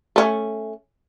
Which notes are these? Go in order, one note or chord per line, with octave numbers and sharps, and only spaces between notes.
A3 C#4